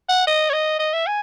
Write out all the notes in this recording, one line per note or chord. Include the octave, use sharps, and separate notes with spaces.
F#5
D#5
C#5
D#5
D#5
E5
G#5